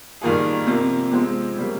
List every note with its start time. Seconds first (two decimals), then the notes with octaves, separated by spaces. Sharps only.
0.21 G2 D#3 A#3 F4 G#4
0.66 C3 F3 A#3
1.11 C3 F3 G#3 C4
1.56 C#3 G3 A#3